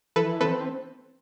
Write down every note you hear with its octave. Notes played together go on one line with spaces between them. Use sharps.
E3 A4 B4
C4 A4 B4